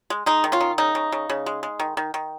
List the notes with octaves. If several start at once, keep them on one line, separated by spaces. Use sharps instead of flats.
G#3
G#3 D#4
D#3
C#4 F4
D#3
C#3 D#4
C#3
C#3
C#3
G#3
G#3
D#3
D#3
D#3